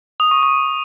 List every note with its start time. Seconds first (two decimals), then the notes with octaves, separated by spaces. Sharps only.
0.20 D#6
0.31 C#6
0.43 C#6